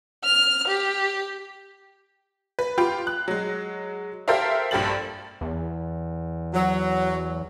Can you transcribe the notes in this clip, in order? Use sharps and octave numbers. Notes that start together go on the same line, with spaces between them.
F6
G4
B4
F4 G4 G5 B5
F#6
F#3 G#3
G4 A4 A#4 C5 E5 F5
A#1 G2 G4 A4 A6 F#7
E2
F#3